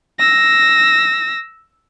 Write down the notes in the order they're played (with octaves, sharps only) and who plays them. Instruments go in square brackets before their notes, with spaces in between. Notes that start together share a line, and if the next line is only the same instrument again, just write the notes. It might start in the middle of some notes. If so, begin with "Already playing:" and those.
[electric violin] E6 A#6